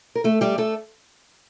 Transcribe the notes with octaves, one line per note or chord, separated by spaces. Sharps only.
A#4
A3 A4
G3 G4
A3 A4